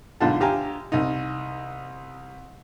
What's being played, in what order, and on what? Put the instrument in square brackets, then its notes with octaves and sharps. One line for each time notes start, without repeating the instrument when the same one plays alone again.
[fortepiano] B1 G#2 D3 F4 A5
D2 G4 F5 G#5 A#5
C2 D#4